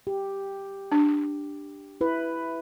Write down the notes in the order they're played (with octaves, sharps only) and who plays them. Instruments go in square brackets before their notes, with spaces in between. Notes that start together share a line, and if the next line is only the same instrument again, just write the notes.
[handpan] G4
[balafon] D4
[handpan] E4 B4